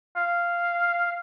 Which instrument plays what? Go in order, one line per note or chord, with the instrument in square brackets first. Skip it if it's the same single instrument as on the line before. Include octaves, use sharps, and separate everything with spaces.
[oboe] F5